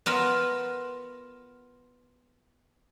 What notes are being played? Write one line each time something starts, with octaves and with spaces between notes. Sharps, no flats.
B3 F4 A#4 E5